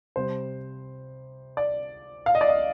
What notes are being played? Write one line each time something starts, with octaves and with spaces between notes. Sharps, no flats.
C3 G3 C5
D5
F5
D#5
D5
D#5